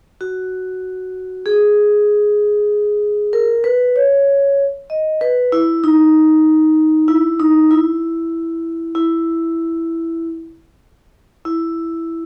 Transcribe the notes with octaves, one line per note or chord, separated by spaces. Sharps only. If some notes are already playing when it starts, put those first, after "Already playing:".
F#4
G#4
A#4
B4
C#5
D#5
B4
E4
D#4
E4
D#4
E4
E4
E4